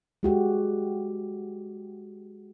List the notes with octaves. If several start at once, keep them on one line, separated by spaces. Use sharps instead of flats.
G#3 F#4 G4